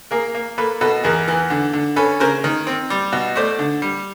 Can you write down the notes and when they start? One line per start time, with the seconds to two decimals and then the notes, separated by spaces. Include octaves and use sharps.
0.11 A#3 G#4 A#4
0.35 A#3
0.58 A#3 A4 B4
0.81 B2 A4 B4
1.04 E2 G#4 A#4
1.28 E3
1.50 D3
1.73 D3
1.96 C#4 A4 B4
2.20 C#3 A#4 C5
2.44 D#3
2.67 C4
2.90 G3
3.12 B2
3.36 A3 C5 D5
3.59 D3
3.82 G3